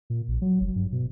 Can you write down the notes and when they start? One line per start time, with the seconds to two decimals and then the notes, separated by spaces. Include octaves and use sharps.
0.10 A#2
0.28 A#1
0.42 F#3
0.61 F#1
0.76 G2
0.92 B2